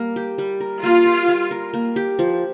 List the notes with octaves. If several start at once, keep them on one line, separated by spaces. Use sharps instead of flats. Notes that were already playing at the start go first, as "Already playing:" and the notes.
Already playing: G3 A#3 A#4
G4
G3
A#4
A#3 F4
G4
G3
A#4
A#3
G4
F3